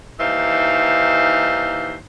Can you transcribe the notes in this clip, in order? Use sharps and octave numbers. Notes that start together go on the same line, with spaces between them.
D#2 E3 D#4 C5 F5